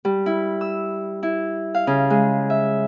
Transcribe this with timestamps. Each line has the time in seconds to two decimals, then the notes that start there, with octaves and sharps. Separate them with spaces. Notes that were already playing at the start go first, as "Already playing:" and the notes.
0.05 G3
0.26 E4
0.61 E6
1.23 E4
1.75 F5
1.87 C#3
2.10 G#3
2.50 E5